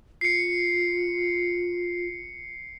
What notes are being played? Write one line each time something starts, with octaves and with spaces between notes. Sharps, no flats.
F4 C7 C#7